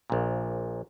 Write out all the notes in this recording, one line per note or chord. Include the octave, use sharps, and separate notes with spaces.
A#1 A#2